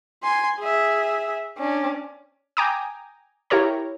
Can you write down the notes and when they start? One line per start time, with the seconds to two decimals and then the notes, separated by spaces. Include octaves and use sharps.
0.23 G#5 C6
0.59 G#4 E5
1.58 C#4 D4
2.57 G5 G#5 A#5 D6 D#6
3.50 E4 G4 A#4 C#5 A#5